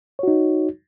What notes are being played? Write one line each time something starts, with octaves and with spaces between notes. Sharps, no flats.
D#4 F#4 C#5